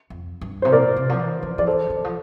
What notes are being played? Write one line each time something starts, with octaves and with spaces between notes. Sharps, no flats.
F2
G2
C3 C5
A#2 A#4 D5
C3
F3
E3
F3
F3 D5
E3 A4 C5
C3
D3
F3